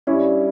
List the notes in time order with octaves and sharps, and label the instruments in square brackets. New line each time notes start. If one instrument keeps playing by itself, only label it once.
[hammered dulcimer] G2 [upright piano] C#4 E4